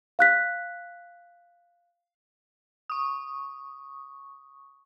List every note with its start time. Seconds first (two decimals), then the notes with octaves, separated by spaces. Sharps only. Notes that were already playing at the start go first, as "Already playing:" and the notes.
0.19 F5 F#6 B6
2.90 C#6 D#6